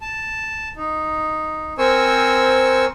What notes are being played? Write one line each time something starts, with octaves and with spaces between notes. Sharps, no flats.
A5
D#4
C4 A#4 C5 G#5 C#6 E6